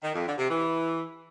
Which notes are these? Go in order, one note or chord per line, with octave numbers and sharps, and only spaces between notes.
D#3
F2
D3
C3
E3